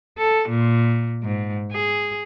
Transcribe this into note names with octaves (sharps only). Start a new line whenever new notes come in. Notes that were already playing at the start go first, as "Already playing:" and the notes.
A4
A#2
G#2
G#4